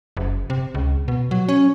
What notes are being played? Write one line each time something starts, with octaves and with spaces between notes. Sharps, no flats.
F#1
C3
C#2
B2
F#3
C#4